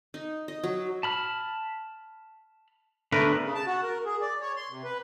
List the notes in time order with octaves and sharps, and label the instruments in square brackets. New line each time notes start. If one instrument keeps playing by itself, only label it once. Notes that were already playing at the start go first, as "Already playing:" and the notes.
[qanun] D#4
D#5
F#3
[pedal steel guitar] A5 B5 F6
[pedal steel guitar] D3 B3 D4 [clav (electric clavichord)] A3 A#4 B4
[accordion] C#3
A5
F#4
A#4
G#4
D5
C#5
C6
C3
B4